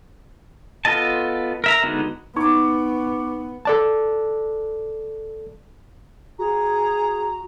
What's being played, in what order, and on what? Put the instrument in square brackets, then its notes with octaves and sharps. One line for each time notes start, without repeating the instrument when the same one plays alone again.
[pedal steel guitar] B3 F4 A4 D#5 A5
A#4 E5 A#5
D3 G#3 B3 D#4 F#4
[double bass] B3 [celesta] D#4 [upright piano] C#6 D6
[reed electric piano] A4 D5 A5
[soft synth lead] F#4 [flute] G#4 [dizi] A#5